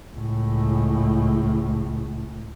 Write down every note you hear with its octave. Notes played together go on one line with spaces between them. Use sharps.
C#2 A2